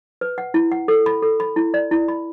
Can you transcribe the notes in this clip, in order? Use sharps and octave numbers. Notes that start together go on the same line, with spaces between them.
B4
F#5
E4
F#5
A4
B5
A4
B5
E4
D5
E4
B5